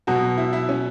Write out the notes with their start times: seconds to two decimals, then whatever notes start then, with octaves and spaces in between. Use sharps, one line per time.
0.07 B2 F#3 F#4
0.38 E4
0.53 E4
0.69 C#4